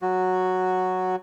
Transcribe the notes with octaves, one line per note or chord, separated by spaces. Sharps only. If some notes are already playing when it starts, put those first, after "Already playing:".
F#3 F#4